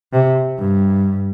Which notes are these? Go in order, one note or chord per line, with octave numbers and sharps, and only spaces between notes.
C3
G2